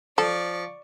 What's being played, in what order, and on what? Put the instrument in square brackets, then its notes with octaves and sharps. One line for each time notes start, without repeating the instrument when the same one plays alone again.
[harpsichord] F3 [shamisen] A4 [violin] D5 C#6